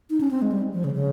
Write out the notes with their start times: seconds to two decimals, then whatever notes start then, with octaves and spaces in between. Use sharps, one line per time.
0.10 D#4
0.21 C#4
0.31 C4
0.42 G#3
0.52 G3
0.74 F3
0.84 C#3
0.94 C#3